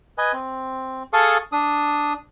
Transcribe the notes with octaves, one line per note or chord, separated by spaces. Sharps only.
B4 D#5 G#5
C4
G#4 A4 F5 A5 C#6 D#6
D4 D#6